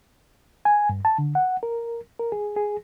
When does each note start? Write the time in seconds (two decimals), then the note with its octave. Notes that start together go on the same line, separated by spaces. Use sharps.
0.65 G#5
0.89 G2
1.05 A5
1.18 D3
1.35 F#5
1.63 A#4
2.20 A#4
2.32 G#4
2.57 G#4